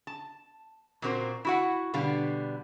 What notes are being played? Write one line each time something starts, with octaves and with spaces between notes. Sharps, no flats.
A5
A#2 A#3 C4 F#4 A#4 C5
E4 F#4 F#5
B2 D3 G3 B3 F5